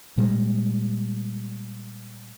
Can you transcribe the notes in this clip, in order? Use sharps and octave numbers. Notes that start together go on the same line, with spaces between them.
A#2 G3 G#3